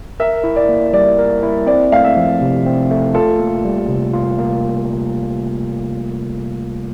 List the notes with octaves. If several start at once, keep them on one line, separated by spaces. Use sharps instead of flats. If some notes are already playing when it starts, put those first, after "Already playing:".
A#4 E5
E4
D5
A#3
G3 D5
A#4
E4
C4 D5
A3 F5
E5
F3
C3
C4
A3
F4 A4
A#3
G3
C3
F4
A#3